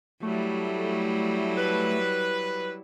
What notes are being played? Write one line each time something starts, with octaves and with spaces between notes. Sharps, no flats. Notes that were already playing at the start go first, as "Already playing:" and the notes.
F#3 G3 A3 E4
B4